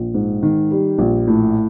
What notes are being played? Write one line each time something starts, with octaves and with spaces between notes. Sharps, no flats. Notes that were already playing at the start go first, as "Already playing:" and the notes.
Already playing: A#1
G#2
D#3
G3
A#1
A2